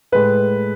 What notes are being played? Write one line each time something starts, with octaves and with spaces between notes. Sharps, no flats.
A2 G#3 B4